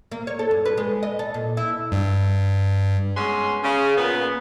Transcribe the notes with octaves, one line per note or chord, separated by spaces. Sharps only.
A#3
C#5
A4
G2
B4
G#3
D#5
A4
A#2
E4
G2
B2 G#3 C#4 C6
C#3
A#2 B3